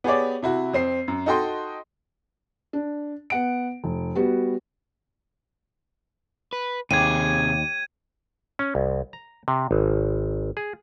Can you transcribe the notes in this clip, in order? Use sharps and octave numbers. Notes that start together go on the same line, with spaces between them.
B3 G4 G#4 C#5 D5
C3 E4 F#4
F2 C4 C7
F#2
D#4 F#4 A4 D#5 G5 C6
D4
B3 F#5 D7
F1
G3 B3 F#4
B4
D#2 C3 G#4 G#6 D#7
C#4
C2
A#5
C3
G#1
G#4